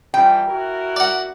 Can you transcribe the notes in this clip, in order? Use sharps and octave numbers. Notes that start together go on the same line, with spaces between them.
E3 F3 G3 G5
E4 F#4 A#4
D5 F#5